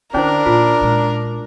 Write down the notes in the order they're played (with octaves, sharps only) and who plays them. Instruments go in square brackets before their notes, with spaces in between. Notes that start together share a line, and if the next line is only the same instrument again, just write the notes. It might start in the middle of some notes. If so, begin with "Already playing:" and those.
[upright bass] D3 [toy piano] C#4 E4 C5 [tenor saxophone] D4 [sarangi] A#4
[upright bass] A#2 [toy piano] F4
[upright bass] A#2 G#3